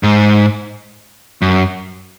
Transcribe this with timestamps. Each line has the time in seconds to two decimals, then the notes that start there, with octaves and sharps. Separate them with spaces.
0.03 G#2
1.42 F#2